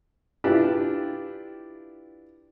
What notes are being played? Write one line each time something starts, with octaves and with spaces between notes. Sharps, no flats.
D4 E4 F4 G4 B4